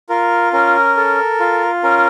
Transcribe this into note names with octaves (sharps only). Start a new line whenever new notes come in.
F4 A#4
C#4 A#4
A4
F4
C#4 A#4